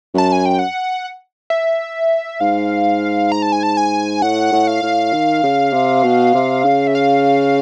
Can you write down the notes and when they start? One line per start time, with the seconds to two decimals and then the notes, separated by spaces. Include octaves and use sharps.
0.14 F#2 A5
0.32 G#5
0.46 G5
0.59 F#5
1.50 E5
2.41 G#2 F5
3.32 A#5
3.42 A5
3.52 G#5
3.63 A5
3.77 G#5
4.22 A2 F#5
4.53 A2
4.67 F5
4.83 A2
5.13 D#3
5.43 C#3
5.73 C3
6.04 B2
6.34 C3
6.65 C#3
6.87 E5
6.95 F5